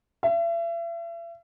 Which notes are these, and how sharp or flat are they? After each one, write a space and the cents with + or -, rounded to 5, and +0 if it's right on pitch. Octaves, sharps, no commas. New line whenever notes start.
E5 +40